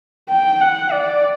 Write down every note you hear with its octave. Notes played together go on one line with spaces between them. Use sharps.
G5
F#5
D5